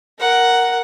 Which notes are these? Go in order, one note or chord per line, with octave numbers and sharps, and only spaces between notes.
A#4 F#5